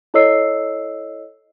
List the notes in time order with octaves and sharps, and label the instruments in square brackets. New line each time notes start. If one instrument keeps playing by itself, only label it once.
[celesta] E4 A4 C#5 D#5 E6 C7